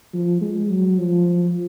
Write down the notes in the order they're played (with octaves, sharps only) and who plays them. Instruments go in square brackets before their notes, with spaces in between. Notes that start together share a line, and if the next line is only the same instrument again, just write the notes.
[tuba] F3
G#3
F#3
F3